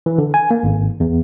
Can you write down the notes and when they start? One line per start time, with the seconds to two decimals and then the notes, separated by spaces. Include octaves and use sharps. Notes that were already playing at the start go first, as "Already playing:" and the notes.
0.06 E3
0.18 D3
0.34 G#5
0.51 A#3
0.63 G#1
1.00 E2